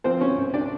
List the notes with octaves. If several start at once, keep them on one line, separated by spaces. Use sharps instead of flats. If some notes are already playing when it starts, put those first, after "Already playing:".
F3 C4 C5
C#4 C#5
C2
D4 D5